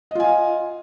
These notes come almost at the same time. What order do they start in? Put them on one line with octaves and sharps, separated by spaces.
D#5 F4 G#5 F5